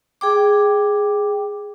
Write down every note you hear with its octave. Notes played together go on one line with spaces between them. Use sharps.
G#4 G5 D6